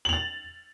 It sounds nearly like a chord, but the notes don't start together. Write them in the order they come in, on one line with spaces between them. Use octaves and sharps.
F#7 F7 A6